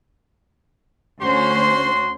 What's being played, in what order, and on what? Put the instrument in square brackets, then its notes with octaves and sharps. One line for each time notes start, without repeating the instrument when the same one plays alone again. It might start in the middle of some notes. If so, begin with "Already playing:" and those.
[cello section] D2 C#4 C5 [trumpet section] F#4 C6